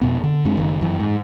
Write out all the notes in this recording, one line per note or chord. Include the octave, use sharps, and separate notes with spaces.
F2 B2 B3
D3
F#2 G#3 C4 D4
F#1 D#3
F#2 E3
G#2